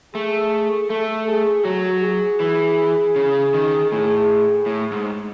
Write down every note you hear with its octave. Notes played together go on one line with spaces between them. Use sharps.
A3 G#4
A3 A4
G#4
F#3 F#4
G#4
E3
C#3
D#3
A2 G#4
A2
G#2